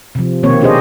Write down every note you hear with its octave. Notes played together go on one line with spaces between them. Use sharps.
C3 F3
B2 D#3 A#3 C4 C#5
D4 D#4 G4 G#4 C5 D#5